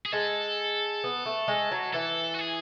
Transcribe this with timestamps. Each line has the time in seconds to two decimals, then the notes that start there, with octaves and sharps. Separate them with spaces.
0.06 G#4
0.13 G#3 A4
1.04 B3
1.26 A3
1.48 G#3
1.71 F#3
1.94 E3 A4
2.34 F#4
2.39 G#4